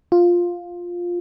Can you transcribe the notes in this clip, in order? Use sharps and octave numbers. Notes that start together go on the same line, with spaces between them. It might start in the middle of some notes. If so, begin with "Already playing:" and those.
F4